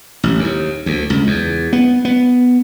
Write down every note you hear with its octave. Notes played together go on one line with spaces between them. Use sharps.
A1
D#2
D2
C#2
E2
B3
B3